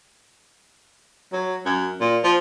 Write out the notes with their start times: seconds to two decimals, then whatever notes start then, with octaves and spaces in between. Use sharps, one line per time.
1.33 F#3
1.65 F#2
2.00 A#2
2.24 F3